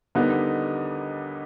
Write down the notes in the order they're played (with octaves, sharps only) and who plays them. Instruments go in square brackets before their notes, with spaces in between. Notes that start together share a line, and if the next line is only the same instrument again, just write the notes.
[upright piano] D#2 D3 G3 B3 D#4